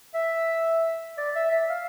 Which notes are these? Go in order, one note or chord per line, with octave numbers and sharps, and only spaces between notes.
E5
D5
E5
E5
F5